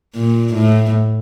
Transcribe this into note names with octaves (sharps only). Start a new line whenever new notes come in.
A#2
A2